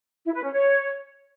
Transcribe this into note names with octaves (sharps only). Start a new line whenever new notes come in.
E4
B4
C#4
C#5